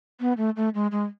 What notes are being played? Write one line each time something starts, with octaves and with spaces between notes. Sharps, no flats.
B3
A3
A3
G#3
G#3